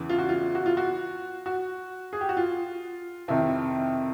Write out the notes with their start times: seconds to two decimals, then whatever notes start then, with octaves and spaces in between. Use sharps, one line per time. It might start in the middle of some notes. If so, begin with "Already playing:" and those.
Already playing: E2 C#3 E3
0.09 F4
0.19 F#4
0.29 F4
0.55 F#4
0.66 F4
0.77 F#4
1.46 F#4
2.13 G#4
2.21 G4
2.29 F#4
2.37 F4
3.28 F2 C3 D#3 E4